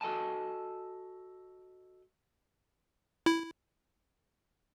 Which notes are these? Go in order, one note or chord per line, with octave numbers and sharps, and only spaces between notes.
F#4 A4 D#5 G#5 A5
E4